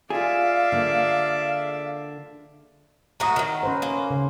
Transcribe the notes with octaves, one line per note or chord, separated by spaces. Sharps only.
F4 G#4 D5 E5 F5
D3 A#3
A2 F#3 F#4 A#5 D#6
D#3 F#3
C#4 B4 C5
A#3
C#3